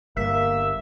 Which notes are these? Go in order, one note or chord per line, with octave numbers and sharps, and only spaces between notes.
G1 A#3 E5